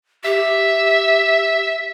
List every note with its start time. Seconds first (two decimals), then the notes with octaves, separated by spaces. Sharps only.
0.24 G4 E5